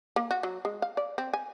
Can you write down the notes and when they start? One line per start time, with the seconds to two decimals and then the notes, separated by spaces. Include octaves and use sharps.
0.16 A#3
0.31 F#4
0.43 F#3
0.65 G#3
0.82 F5
0.97 D5
1.18 C4
1.33 G#5